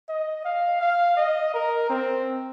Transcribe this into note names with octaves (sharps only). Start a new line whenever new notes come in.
D#5
F5
F5
D#5
A#4
C4